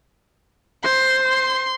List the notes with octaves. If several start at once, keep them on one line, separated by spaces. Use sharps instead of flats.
C5 C6
C6